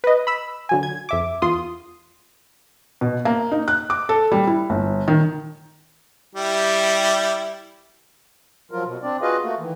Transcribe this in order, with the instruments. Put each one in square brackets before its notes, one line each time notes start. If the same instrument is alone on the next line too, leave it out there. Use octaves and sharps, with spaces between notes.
[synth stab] B4 D#5
B5 E6
D3 F#3 G#5
G#6
F2 E5 D6
E2 F4 C6 D#6
[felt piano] B2
A#3
D#4
F#6
D6
A4
G3
E4
G1
D#3
[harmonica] G3 E4 G4
[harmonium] F3 F#3 F4 A#4
B2
C4 D4 D5
F4 F#4 G#4 B4 D#5 F5
A3 A#3 F#4
D#3 E3